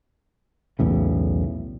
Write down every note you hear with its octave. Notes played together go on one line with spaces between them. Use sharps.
B1 E2 A2 C#3